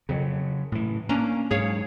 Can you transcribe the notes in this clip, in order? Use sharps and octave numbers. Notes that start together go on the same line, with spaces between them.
F2 C#3 F#3
A2 E3
A#3 C#4 D4 A#5
G#2 F#3 G#4 C#5 F5